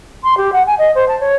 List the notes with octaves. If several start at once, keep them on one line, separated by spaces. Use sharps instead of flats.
C6
G4
F#5
G#5
D#5
C5
A5
C#5